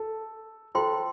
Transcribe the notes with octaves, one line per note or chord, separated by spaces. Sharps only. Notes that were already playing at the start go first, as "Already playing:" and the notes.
Already playing: A4
F4 A4 C5 G5 C6